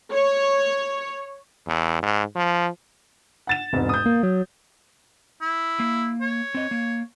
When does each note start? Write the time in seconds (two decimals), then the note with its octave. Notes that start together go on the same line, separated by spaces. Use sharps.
0.13 C#5
1.67 E2
2.03 G#2
2.36 F3
3.47 F#5 A6 E7
3.73 E1 G#2 C3
3.89 D#6 G6
4.06 A#3
4.23 F#3
5.41 E4
5.80 A#3
6.21 C#5
6.55 C4 D#5
6.71 A#3